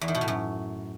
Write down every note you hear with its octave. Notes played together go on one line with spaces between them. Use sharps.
E2
D#3
B2
A2
F#2